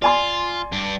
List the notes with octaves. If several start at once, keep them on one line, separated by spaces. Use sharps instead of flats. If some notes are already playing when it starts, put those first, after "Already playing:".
F4 D5 G#5 C6
G2 D4